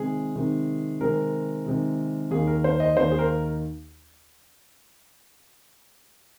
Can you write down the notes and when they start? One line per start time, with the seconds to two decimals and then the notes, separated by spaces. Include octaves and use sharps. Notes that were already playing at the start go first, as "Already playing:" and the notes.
Already playing: C3 D#3 G#3 C4 G#4
0.36 C3 D#3 G#3 C4
1.01 C3 D#3 G#3 C4 A#4
1.66 C3 D#3 G#3 C4
2.31 D#2 D#3 A#3 D#4 G#4
2.47 A#4
2.64 C5
2.80 D#5
2.96 D#2 D#3 A#3 D#4 C5
3.11 G#4
3.19 A#4